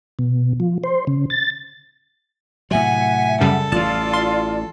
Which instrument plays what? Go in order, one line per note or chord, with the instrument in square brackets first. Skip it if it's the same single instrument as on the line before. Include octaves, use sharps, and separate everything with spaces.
[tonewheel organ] B2
F3
C5
C#3
A6
[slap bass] A2 C3 F#3 [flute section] E5 F#5 [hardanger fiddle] G#5
[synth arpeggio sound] F#2 C#3 G3 [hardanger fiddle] A4
[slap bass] A1 E3 [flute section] F4 D5 [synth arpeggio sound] A5
[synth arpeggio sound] C6